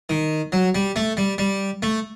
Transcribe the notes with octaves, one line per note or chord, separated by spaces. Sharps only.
D#3
F#3
G3
A3
G3
G3
A3